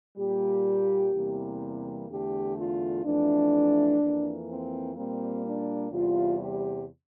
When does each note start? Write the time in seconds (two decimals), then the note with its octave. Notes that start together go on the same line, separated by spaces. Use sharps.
0.17 A#2 G3 A#3 G4
1.14 E2 C3 E3 G3 A#3
2.08 E2 D3 A3 G4
2.56 F4
3.04 F2 E3 A3 D4
3.99 F2 E3 A#3
4.48 C4
4.96 A#2 G3 A#3 C4
5.43 D4
5.91 E2 C3 G3 F4
6.38 G4